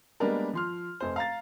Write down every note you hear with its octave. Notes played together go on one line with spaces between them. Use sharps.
G3 G#3 A#3 B3 D4 A#4
F3 C6 F6
F1 C5
F5 A#5 A6